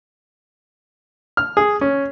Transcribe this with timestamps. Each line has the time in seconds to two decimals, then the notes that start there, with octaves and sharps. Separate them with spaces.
1.37 F6
1.57 G#4
1.81 C#4